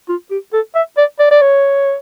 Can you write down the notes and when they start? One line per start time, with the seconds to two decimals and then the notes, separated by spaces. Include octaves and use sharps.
0.09 F4
0.30 G4
0.53 A4
0.75 E5
0.97 D5
1.19 D5
1.31 D5
1.41 C#5